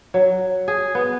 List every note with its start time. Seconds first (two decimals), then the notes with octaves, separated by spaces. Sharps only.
0.14 F#3
0.68 G#4
0.95 B3